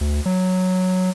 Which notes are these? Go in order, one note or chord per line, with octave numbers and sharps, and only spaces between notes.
D2
F#3